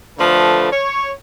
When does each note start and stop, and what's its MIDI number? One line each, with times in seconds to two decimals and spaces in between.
0.19 0.71 50
0.19 0.71 53
0.19 0.71 57
0.19 0.71 71
0.72 1.11 73